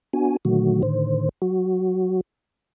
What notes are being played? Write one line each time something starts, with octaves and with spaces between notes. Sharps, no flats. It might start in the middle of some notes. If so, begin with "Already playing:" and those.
B3 D4 F#4 G#5
A#2 D3 D#3 F#3 A3 F#4
A2 D3 D#3 C5
F#3 F#4